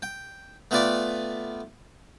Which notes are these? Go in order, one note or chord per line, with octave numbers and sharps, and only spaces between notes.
G5
A3 B3 F4 B4 D5 G5